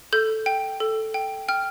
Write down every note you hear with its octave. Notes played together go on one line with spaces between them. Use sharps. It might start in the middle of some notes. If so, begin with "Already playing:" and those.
A4 G6
G5
A4
G5
G5 F6